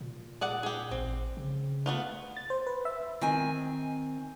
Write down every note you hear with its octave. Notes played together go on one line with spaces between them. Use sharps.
A#2
G#4 D5 F#5
G4 G#4
A1 C4
C#3
A3 B3 F4
A6
C5
B4
E5
D#3 C4 G#5